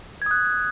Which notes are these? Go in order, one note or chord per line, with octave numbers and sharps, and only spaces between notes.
D#6 F#6 G#6